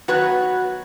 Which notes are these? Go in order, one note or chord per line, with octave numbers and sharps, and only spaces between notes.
D#3 F#3 B3 F#4 B4